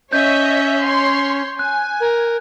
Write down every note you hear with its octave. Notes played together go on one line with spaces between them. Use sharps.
C#4 C#5 D#5 E5 G6
C#5 C6
G#5 F#6
A#4